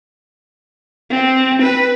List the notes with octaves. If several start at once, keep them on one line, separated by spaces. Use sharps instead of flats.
C4
B4